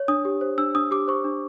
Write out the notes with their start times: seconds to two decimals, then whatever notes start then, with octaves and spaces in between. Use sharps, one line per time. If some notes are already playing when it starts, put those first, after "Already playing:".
Already playing: C#5
0.08 D4 D#6
0.25 G4
0.41 C5
0.58 D4 E6
0.75 D4 D#6
0.91 G4 D6
1.08 C5 C#6
1.24 D4